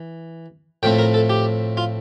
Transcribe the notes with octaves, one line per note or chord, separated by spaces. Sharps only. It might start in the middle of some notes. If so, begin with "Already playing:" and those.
Already playing: E3
A2 F3 A3 C4 G5
A#4
A4
G4
F4